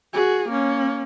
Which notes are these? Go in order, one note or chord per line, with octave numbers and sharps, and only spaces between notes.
F#4 G#4
A#3 C#4